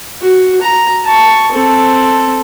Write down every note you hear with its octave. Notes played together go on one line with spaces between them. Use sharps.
F#4
A#5
A5 C#6
C4 A4